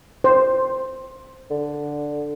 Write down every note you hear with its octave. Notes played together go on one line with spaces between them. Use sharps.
C5
D3